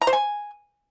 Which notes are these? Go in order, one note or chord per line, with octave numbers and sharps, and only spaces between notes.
A#5
C5
G#5